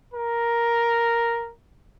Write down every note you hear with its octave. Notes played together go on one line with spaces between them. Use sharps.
A#4